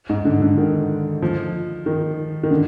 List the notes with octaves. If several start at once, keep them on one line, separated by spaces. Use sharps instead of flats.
G#2
D3
D3
D#3
F3
D#3
D#3
D3